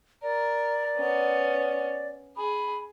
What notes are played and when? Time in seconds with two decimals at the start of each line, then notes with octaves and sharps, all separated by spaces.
0.23 A#4 D5
0.97 B3 C#4
2.37 G#4 B5